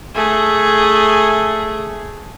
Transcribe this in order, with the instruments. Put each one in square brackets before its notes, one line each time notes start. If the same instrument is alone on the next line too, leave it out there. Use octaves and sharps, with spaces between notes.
[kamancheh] A3 G#4